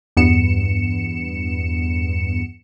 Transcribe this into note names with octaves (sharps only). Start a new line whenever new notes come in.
E2 G2 B3 C#7 E7